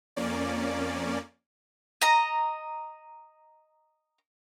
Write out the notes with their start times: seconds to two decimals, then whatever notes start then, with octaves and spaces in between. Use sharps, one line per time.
0.16 F2 A#3 C#4 D5
2.02 D#5 A#5